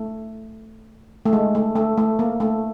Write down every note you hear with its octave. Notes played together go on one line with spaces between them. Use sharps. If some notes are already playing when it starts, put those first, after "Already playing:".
Already playing: A3
A3
G#3
A3
A3
A3
A#3
A3